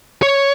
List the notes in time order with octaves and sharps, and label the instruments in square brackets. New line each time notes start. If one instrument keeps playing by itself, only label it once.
[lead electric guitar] C#5